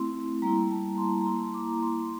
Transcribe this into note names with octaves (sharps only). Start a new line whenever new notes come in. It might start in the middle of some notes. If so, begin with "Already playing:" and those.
Already playing: A3 C4 E4 C6
G3 A#3 E4 A#5
A5
C6
A#5
A#3 E4 C6
D6
C6